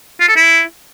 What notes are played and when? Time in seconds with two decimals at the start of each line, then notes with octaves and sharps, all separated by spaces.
0.20 F4
0.28 A4
0.36 E4